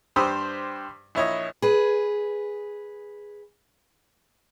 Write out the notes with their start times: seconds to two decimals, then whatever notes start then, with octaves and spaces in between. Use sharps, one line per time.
0.16 G2 G4 C5 B5 D#6 E6
1.15 A#1 E4 C#5 D#5
1.62 G#4 B4